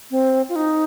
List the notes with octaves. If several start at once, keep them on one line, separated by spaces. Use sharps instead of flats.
C4
F4
D#4